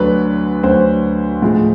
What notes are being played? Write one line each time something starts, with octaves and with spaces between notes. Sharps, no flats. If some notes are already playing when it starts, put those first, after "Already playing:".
Already playing: D2 D3 F#3 B4
D2 D3 F#3 C5
A2 F3 G#3